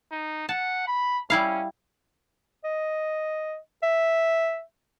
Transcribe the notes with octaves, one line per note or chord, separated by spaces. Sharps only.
D#4
F#5 A5
B5
G3 C#4 E4 F5
D#5
E5